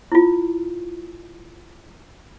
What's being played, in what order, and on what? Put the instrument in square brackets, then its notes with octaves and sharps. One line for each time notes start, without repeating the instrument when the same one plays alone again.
[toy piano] E4 F4